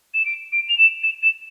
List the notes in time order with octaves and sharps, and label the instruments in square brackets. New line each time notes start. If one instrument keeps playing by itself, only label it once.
[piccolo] E7
D7
D7
F7
E7
E7
E7